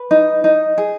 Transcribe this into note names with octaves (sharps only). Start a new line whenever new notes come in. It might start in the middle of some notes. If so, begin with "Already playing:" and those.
Already playing: B4
D#4
D#4
G#4